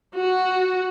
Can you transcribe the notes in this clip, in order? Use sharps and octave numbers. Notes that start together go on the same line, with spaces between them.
F#4